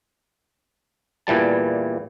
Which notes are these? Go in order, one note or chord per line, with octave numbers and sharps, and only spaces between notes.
E2 A#2 E3 G3 A5